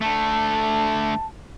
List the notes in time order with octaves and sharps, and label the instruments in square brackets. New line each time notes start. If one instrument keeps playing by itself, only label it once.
[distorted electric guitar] D3 A3 [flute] A5